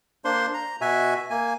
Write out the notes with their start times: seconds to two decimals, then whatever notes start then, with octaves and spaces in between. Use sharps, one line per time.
0.25 A#3 D4 C5 C6
0.54 A#5
0.81 B2 F#4 E5 G#5
1.30 A#3 G#5